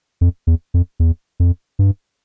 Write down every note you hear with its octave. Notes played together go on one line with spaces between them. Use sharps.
F2
E2
F2
E2
F2
G2